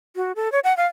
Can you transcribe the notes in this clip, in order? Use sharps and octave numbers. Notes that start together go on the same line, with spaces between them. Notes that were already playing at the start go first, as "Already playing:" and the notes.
F#4
A4
C#5
F#5
F5